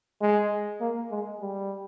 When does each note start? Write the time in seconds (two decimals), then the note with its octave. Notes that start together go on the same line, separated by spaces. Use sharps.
0.21 G#3
0.81 A#3
1.11 G#3
1.41 G3